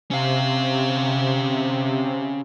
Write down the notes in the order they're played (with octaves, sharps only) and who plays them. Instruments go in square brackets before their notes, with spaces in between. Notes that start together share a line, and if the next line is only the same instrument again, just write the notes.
[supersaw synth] C3 [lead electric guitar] C#4 F5